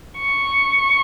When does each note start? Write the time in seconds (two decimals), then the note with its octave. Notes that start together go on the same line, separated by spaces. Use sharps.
0.19 C#6